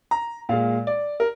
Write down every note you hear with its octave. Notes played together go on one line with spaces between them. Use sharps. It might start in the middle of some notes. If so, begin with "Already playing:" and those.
A#5
A#2 G#3 F5
D5
A#4